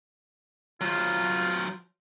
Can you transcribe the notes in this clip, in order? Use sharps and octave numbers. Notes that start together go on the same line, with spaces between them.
F#3 F4 C5